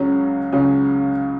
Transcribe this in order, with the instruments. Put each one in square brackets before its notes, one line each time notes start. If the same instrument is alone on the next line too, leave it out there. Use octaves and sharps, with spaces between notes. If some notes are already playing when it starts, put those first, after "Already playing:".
Already playing: [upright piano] C#2 C#3 F#3 C#4
C#2 C#3 F#3 C#4